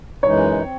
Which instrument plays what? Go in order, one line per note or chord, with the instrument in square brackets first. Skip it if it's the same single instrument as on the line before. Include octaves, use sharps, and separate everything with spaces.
[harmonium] F#2 E3 G#3 D#4 [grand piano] C#5
[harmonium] C4